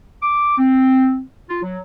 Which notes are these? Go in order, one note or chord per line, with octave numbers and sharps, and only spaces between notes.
D6
C4
F4
F#3